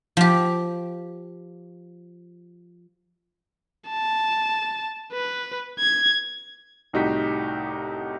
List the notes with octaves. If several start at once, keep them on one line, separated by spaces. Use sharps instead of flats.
F3 G4
A5
B4
G#6
C2 A2 D#4 F#4 G4 B6